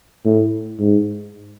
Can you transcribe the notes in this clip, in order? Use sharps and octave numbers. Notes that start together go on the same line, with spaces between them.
A2
G#2